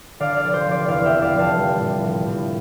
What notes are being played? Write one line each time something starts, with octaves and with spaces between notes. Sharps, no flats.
D3 D5 F5
D5
F1
C5
F1
D5
E2 D5 F5
E5 G5
D3
D5 F5
F1
F5 A5
G3
A2
A#1
A2